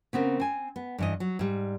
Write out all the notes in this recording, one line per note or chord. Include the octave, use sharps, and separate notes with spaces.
C#3 B3 C4 A#4
C4 G#5
B3
G2 E3 D#5
F#3
G#2 G3